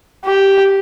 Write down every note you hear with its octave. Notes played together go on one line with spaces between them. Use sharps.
G4